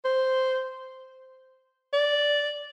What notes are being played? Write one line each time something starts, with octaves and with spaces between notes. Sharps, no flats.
C5
D5